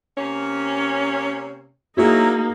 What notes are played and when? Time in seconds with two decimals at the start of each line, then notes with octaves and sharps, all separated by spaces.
0.18 C3 A#3 C#4
1.97 F#3 A#3 D#4 E4 F#4 G#4